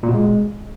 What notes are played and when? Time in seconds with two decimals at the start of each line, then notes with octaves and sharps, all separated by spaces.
0.03 A#2
0.09 B2
0.14 G#3